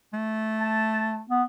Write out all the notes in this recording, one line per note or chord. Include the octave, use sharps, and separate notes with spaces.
A3
A5
B3